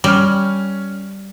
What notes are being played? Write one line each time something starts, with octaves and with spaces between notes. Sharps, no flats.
G3 C#4 F6